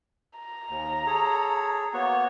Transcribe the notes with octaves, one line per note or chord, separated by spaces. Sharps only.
A#5
D#2
G#4 A4 C#5
A#3 B3 F#4 C#5